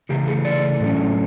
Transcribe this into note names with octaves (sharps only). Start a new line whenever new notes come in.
C#3 E3 A3 G4
G#4
D5
A2 F#3 A3 C#4